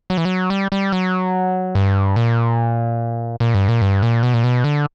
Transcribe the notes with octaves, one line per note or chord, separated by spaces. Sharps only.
F#3
E3
F#3
G3
G3
F#3
G2
A#2
A#2
G2
A#2
G2
A#2
B2
A#2
B2
D3